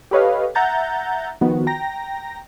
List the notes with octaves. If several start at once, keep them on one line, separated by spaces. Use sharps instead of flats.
G4 A4 B4 C#5 D#5 F5
E5 F#5 A#5 G6 A6
D#3 F3 B3 F#4
G5 A#5 A#6